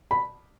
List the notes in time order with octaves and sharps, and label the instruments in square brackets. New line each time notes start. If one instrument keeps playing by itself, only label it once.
[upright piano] B5